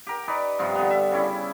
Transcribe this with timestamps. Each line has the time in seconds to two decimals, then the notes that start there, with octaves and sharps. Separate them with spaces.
0.07 G4 A#4
0.28 D#4 B4 D5
0.59 G2 C3 F3 D#4
0.75 D3 B3
0.90 E5
1.11 C#3 G3 C#4 E4